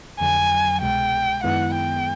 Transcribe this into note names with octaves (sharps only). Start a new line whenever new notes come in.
F2 D3 F#3 G#5
C2 B2 G#3 G5
F#2 D#3 G#3 B3 E4 F#5
G5